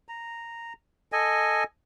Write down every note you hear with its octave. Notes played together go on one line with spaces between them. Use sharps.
A#5
A4 D#5 G#5